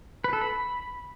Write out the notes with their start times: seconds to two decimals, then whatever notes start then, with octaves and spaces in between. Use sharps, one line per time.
0.24 B4
0.33 A4
0.41 B5